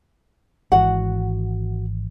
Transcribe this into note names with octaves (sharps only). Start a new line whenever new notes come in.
G#1 G#2 E3 F#4 F#5